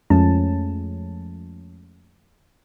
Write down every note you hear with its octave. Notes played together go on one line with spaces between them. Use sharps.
F2 F3 G#3 A3 C#4 A5